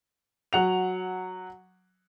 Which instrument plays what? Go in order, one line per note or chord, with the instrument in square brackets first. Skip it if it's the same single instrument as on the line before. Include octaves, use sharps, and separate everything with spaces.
[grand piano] F#3 F#5 F7